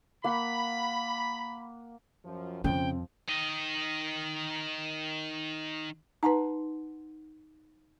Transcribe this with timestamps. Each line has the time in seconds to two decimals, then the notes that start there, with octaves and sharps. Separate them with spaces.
0.24 A#3 F#5 B5
2.25 F#2 F3
2.64 F2 C#3 F3 C4 G5
3.29 D#3 D#5
6.23 D#4 B4 F#5 A#5 C6